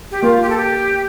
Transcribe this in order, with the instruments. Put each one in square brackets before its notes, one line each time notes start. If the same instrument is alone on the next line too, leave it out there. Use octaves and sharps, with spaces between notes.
[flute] G4
[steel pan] A#3 [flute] F4
[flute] G4
A4
G4